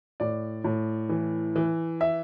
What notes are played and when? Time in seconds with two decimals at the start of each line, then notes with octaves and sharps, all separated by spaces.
0.20 A2 D5
0.64 A2
1.09 E3
1.56 E3
2.01 E5